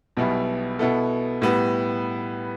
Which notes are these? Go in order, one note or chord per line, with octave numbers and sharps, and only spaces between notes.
B1 B2 G3 B3 E4
B2 B3 E4 A4
A2 G3 B3